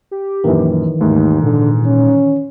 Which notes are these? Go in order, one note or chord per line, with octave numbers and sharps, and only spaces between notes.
G4
A#1 F#2 D#3 E3
D#2 G#2 A3
A#2 D3
C#4